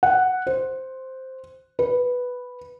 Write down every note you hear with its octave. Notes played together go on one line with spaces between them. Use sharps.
F#5
C5
B4